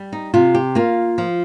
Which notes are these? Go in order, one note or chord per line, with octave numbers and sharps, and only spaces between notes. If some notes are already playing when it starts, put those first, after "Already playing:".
Already playing: G3
D#4
C3 F4
G4
A#3 F4
F3